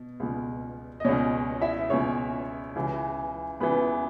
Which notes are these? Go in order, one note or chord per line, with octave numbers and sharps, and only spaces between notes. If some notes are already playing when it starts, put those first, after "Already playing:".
Already playing: B2
C#2 B2
D#5
C#2 B2 C#4 C#5
E4 E5
C#2 B2 C#4 C#5
C#2 C#3 E3
C#2 C#3 E3 B3 B4